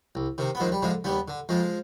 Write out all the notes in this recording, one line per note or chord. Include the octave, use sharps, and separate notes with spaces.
C2
C3 D#3
B3
D#2 F3 G#3
G3
D3 F3 G#3
D#2 G3 B3
D3
F2 F3 G#3